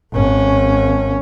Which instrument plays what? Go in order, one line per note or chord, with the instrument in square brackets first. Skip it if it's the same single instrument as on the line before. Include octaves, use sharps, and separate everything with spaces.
[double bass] G#1 C#4